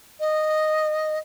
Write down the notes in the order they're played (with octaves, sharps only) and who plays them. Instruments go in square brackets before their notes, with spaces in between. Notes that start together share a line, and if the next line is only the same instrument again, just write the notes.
[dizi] D#5